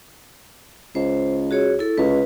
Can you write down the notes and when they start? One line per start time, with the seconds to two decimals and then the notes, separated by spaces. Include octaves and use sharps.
0.95 C#2 C5
1.51 F#4 G#4 C#5
1.79 E4 A4
1.98 C#2 B4